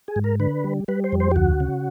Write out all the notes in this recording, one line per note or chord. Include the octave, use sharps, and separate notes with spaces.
G#4
G#2
A#4
D3 B4
G3
G3 B4
C5
F2
C5
G4
D2 F#4
C#3